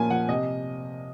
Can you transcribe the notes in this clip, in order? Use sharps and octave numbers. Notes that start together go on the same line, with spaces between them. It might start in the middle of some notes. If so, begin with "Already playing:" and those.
Already playing: A#2 F3 A#3 C#4 G#5
F3 F#5
C3 D#5